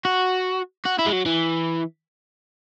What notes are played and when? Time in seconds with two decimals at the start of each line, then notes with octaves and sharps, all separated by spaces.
0.05 F#4
0.86 F#4
0.99 E4
1.07 G#3
1.13 F#3
1.26 E3